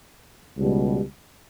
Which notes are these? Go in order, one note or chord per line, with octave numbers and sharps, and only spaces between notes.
C#2 B2 G3